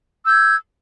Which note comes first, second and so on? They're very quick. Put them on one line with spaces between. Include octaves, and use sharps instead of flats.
E6 G6 G#6